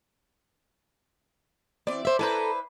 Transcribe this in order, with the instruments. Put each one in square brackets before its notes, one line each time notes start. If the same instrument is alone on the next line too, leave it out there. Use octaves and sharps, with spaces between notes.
[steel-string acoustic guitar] E3 C4 [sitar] D5
[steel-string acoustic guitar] C5 E5
[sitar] E4 B4 C5 [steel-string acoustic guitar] A4 G#5 A#5